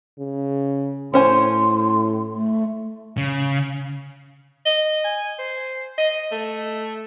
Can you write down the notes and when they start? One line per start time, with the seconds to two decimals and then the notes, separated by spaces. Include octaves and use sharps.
0.19 C#3
1.14 A2 C#4 C5 G#5 C6
2.35 A3
3.18 C#3
4.66 D#5
5.04 G#5
5.39 C5
5.98 D#5
6.32 A3